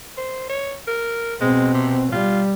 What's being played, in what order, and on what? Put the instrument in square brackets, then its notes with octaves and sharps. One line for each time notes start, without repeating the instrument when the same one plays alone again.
[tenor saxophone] C5
C#5
A#4
[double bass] B2 C4 [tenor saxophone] G#3
[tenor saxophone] C3
[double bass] G3 [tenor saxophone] F4